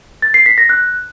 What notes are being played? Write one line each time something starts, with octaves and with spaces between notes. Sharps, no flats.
A6
C7
B6
A#6
F#6